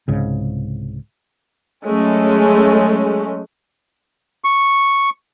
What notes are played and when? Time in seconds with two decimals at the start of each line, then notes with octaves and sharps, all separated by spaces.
0.08 C2 G#2 C#3
1.86 F#3 G#3 A3 C#4
4.44 C#6